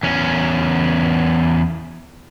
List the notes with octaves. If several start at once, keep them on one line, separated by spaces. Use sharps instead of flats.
E2 C#4